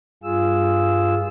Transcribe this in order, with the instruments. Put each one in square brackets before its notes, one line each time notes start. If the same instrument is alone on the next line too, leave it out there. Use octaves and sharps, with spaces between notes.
[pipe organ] G2 F4 G#4 E6